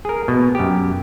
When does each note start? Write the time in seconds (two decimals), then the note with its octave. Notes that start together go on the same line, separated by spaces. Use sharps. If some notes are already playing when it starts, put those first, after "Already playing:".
0.05 G#4 A#4
0.28 B2
0.55 F#2 G4